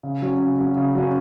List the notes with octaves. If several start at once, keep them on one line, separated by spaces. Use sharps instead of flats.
C#3
F#3 C#4
C#3
F#3 C#4
C#3
F#3 C#4